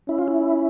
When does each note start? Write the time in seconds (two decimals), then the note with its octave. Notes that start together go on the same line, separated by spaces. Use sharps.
0.09 C#4 E4
0.18 F4
0.28 E4